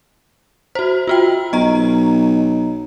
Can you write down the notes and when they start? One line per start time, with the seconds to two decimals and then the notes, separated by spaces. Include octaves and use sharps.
0.75 F#4 C5
1.07 F4 F#4 G5
1.53 B1 D#5 A#5